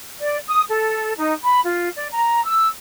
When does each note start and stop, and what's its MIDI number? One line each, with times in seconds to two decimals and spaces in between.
0.19 0.39 74
0.47 0.62 87
0.69 1.12 69
1.16 1.33 63
1.44 1.60 83
1.64 1.89 65
1.97 2.08 74
2.12 2.44 82
2.45 2.66 88